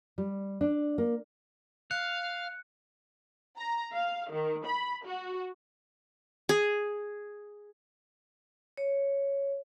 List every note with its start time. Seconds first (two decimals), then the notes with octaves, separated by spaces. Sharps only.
0.18 G3
0.61 D4
0.98 A#3
1.91 F5 F#6 C#7
3.58 A#5
3.94 F5
4.32 D#3
4.66 B5
5.06 F#4
6.49 G#4
8.77 C#5